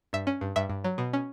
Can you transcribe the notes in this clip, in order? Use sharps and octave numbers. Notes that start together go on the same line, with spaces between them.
G2 E5
C#4
G2
G2 E5
G2
F#3
B2
C#4